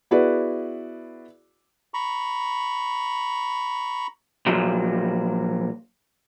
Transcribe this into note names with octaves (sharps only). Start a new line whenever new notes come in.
B3 E4 F#4 G#4 B4 D5
A#5 B5 C#6
A#2 F3 F#3